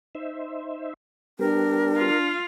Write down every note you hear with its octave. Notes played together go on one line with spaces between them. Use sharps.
D#4 C5 E5
G3 B3 D4 G4 A#4
F4 F5